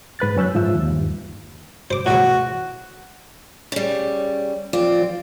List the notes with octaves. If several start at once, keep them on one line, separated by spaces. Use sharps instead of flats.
G#2 B4 F#6 A6
F#2 C#4 E6 F#6 G6
G#2 F3 F4 E5 E6
D#2
G2
C5 D6
E2 A2 F#4
C#3 G3
F3 C4 F4 D5